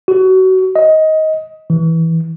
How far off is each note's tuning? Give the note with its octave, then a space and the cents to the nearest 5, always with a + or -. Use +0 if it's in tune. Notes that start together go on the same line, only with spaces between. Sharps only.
F#4 +25
D#5 +15
E3 -10